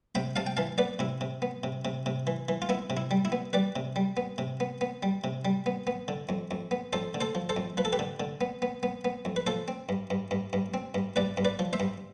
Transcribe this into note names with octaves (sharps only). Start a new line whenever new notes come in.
C3 G5 B5
C3 F5 A5
G5
E3 F5 A5
B3 B4 D5
C3 E4
C3
B3
C3
C3
C3
E3
E3
F4
B3 E4
C3
E4
G3
E4
B3
G3 B4 D5
C3
G3
B3
C3
B3
B3
G3
C3
G3
B3
B3
D3
F2
F2
B3
F2 A4 C5
D3
A4 C5
F3
A4 C5
F2
F3 B4
A4
G4 B4
D3
D3
B3
B3
B3
B3
F2
B4
F3 A4 C5
C4
G2
G2
G2
G2
C4
G2
G2 B4 D5
G2
B4 D5
F3
C5 E5
G2